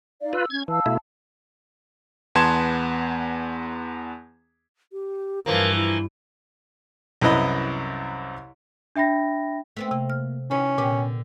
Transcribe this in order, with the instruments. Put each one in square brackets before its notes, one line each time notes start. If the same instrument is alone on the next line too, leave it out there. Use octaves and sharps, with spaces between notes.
[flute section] D#4 D5 F5
[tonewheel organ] F4 B4 [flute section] E6
[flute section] C#4 [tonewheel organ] G#6
[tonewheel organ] E3 [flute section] F5 A5 E6
[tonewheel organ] B2 A3 E4
[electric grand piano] E2 B3 A5 C6 G#6 E7
[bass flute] G4
[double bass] G2 [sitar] E3 F3 A#3 [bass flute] A#4
[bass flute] E4
[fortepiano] C2 F#2 E4 B4 D#5 B5
[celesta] D4 E5 G5 B5 A#6
[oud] A3 B3 C4
[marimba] C3 [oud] A#3
[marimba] F6
[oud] D#3 E3 [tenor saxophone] C#4
[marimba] A#2 [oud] D3 B3 G4